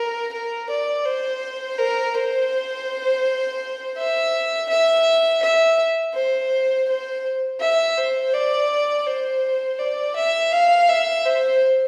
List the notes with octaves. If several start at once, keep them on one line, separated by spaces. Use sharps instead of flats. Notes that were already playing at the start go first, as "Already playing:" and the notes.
Already playing: A#4
A#4
D5
C5
A#4
C5
E5
E5
E5
C5
C5
E5
C5
D5
C5
D5
E5
F5
E5
C5